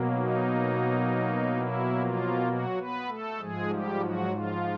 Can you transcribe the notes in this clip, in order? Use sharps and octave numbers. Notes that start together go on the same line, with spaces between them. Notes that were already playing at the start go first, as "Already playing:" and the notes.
Already playing: B2 F#3 A#3
D#4
E4
F3 F4
F#3 F#4
B3 B4
A3 A4
G#2 F3 G#3 G#4
G3 G4
F#3 F#4
F3 F4